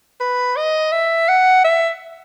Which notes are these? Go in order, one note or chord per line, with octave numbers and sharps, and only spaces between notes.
B4
D#5
E5
F#5
E5